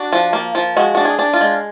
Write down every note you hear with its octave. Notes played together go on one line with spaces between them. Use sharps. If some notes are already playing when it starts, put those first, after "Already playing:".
Already playing: D4 F#4
F3
A#3
F3
G#3 F#4
D4 F#4
G#4
D4
F4
G#3